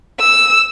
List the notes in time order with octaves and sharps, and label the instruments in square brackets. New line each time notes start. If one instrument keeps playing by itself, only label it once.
[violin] E6